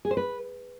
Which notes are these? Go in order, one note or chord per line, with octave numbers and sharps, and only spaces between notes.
G#4
C5
B4